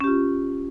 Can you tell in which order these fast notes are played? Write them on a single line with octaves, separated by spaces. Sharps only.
C#4 G4 F4